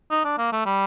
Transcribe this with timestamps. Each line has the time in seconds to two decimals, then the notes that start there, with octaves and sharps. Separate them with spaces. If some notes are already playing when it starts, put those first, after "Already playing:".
0.11 D#4
0.25 D4
0.38 A#3
0.52 A3
0.66 G3